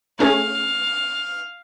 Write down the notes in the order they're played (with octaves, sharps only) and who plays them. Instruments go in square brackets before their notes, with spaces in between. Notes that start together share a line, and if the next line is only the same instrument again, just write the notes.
[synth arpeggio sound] A3 C#4 G#4 [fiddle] F5